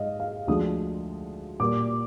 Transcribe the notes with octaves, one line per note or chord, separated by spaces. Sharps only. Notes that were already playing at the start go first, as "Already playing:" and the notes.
Already playing: G#2 D#5 F5
F5
D2 D3 F3 G#3 D#6
A#2 G3 A#3 D6